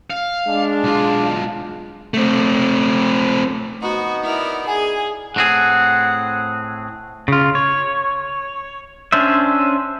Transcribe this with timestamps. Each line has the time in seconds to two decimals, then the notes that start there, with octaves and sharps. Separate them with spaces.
0.10 F5
0.47 G#3 D4
0.84 B1 F4
2.14 A3 C4
3.82 B3 D#4 F#4
4.22 E4 A#4 D5
4.67 G#4 G#5
5.36 A2 C4 G#4 F#5
7.28 C#3 F4
7.55 C#5
9.12 C#4 D4 C5 E5